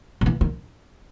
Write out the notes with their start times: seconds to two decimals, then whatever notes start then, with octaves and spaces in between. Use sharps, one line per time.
0.21 D#3
0.26 E3
0.41 D#3